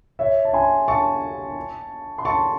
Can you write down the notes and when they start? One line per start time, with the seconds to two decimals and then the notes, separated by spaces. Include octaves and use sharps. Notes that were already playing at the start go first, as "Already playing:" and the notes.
0.19 C#5 E5
0.45 A5
0.54 G#5 C6
0.88 A5 C#6
2.18 C6
2.25 A5 C#6